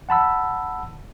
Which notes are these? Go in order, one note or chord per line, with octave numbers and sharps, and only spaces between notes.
F#5 A5 B5 E6